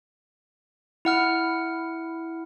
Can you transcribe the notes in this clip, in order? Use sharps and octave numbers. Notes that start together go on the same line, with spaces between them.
E4 F#5 F6